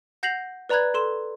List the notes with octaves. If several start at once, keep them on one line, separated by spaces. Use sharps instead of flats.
F#5 G6 A#6 C7 F7 F#7
B4 D5 A#5 B5 F#6 G#6
A4 C6 E7